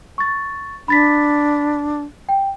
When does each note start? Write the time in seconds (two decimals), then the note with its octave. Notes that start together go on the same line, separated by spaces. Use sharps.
0.18 C#6 A6
0.88 D4 B5 A6 B6
2.29 G5